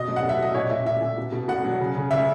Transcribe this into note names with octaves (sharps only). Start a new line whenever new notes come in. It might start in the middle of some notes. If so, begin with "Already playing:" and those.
Already playing: B2 D#5
F#3
F#5
B2
E5
B2 D#5
A#2 C#5
A#2 E5
A#2 E5
A#2
B2
B2
B2 F#5
F#3
C#3
C#3
C#3 E5